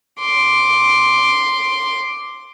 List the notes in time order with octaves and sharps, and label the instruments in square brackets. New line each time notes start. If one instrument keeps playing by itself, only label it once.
[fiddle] C6 D6